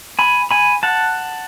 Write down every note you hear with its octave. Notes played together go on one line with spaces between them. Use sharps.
G#5 B5
G#5 B5
F#5 A5